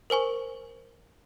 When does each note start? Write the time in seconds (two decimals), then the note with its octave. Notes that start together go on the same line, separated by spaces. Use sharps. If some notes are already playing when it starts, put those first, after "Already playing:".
0.10 A#4 C5 G#5 C#6